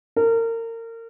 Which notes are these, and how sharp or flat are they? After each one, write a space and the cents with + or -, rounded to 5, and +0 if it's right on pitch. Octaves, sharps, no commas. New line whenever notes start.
A#4 -30